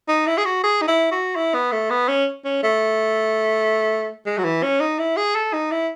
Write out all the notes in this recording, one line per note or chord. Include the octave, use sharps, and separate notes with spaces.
D#4
E4
G#4
F#4
G#4
D#4
E4
F#4
E4
B3
A3
B3
C#4
C#4
A3
G#3
F#3
E3
C#4
D#4
E4
G#4
A4
D#4
E4